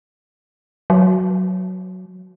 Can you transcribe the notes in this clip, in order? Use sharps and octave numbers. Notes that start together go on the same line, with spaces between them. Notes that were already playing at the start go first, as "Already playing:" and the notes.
F#3